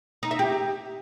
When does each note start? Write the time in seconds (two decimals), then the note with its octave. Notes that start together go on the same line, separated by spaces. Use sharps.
0.23 D#4
0.31 E5
0.39 G4